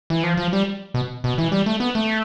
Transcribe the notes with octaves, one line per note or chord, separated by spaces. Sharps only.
E3
F3
F3
G3
B2
B2
E3
G3
A3
B3
A3